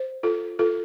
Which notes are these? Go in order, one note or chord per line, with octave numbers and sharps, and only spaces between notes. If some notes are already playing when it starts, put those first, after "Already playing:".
Already playing: C5
F4 A4
F4 A4